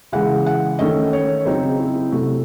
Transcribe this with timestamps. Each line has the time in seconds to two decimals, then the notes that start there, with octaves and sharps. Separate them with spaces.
0.12 C#3 E3 G#3 F#5
0.46 F#5
0.79 D#3 A3 C#4 D#5
1.13 C#5
1.45 C#3 F#3 C4 D#4 C5
1.63 G#4
1.80 E4
1.96 E4
2.12 C3 F#3 A3 F#4